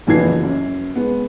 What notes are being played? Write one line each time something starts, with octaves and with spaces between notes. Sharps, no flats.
F#1 F2 E3 F#4 G#6 C7
F#2
G#3 B3